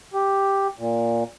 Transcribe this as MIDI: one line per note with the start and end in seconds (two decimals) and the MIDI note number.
0.14 0.68 67
0.78 1.24 46